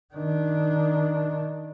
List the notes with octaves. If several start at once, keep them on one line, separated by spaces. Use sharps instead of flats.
D#3 D4